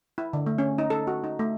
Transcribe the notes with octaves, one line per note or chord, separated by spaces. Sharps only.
E4
D3
A3
C#4
D#4
A4
F#4
D#4
A3